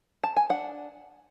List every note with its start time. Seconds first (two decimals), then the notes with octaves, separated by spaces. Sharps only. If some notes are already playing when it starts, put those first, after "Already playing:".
0.24 A5
0.36 G#5
0.50 D4 F#5